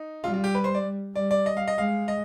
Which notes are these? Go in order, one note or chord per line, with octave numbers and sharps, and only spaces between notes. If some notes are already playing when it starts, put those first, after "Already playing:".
Already playing: D#4
G3 F4
F4
G4
B4
C5
D5
G3 D5
D5
D#5
F5
D#5
G#3 F5
D#5